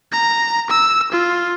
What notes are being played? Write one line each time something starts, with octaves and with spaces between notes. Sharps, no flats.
A#5
E6
F4